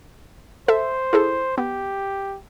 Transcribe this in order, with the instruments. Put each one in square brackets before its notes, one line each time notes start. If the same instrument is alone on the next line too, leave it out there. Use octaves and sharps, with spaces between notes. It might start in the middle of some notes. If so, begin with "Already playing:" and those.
[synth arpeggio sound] A4 E5 [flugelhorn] C5
[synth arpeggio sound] E4 G#4 A4
[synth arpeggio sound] B3 [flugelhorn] G4